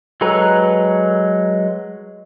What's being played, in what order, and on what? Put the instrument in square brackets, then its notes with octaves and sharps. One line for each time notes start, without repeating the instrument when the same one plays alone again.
[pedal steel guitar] F#3 G#3 A4 B4 A#5